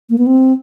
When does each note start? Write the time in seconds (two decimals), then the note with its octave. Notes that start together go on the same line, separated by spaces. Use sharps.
0.10 A#3
0.18 B3
0.27 C4